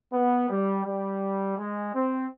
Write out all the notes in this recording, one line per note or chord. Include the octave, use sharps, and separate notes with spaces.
B3
G3
G3
G#3
C4